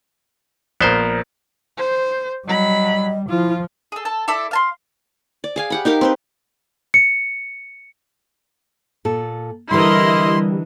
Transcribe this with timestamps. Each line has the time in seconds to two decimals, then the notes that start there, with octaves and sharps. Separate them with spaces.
0.81 A#1 B3 A#4 C5
1.77 C5
2.48 F#3 G3 D#5 B5
3.30 F3 E4 F4
3.92 G#4 A4
4.05 A4 A5
4.28 E4 A4 D5 E5
4.51 F5 A5 C6
5.44 D5
5.56 G#4 F5 G#5
5.70 G4 F#5 B5
5.85 D#4 G4 A#4 F5
6.01 C4 B4 C5
6.94 C#7
9.05 A#2 A4
9.71 D3 E3 G3 E4 A#4 D#5 C6